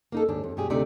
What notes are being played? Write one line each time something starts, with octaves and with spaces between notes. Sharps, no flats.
A#3 D#4 A4
D#2 G#2 D4
F2
G2 B2 G3 G4 G#4
D2 C3 A3 D4 D#4 D5